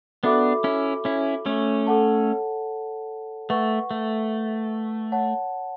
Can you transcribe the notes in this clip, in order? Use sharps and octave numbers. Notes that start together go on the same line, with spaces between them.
B3 D4 F#4 A4 E5 B5 D6
C#4 E4
C#4 E4
A3 C#4
A4 C#5 F#5 A5
A3 B4 F#5 C#6
A3
C#5 F#5 A5